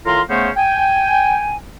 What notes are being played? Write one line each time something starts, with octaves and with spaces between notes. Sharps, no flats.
A2 D#3 F4 F5 A#5 C6
C#3 A3 B3 C#4 C5
G5 G#5